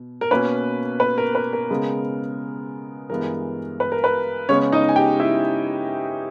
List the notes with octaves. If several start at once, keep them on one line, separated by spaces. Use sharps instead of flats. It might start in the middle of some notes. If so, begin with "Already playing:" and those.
Already playing: B2
A#4
B2 A#3 C#4 B4
B4
A#4
B4
A#4
C#3 G#3 B3
G2 E3 G#3 B3 A#4
B4
A#4
B4
C#3 G#3 B3 C#4 C#5
D#4 D#5
G#5
G4 G5
E4 E5